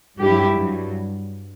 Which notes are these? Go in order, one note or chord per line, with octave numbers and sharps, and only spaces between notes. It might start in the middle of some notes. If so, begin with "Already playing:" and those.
G2 F#3 E4 G4
G2 F#3